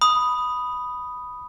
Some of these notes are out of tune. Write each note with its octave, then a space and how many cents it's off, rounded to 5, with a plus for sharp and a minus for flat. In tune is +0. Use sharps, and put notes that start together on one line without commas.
B5 +0 D#6 +0